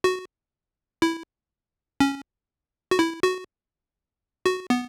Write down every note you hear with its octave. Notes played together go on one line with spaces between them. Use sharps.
F#4
E4
C#4
F#4
E4
F#4
F#4
B3